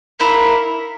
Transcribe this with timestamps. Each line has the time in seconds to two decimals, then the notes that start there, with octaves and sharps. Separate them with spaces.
0.20 A#3 E4 A#4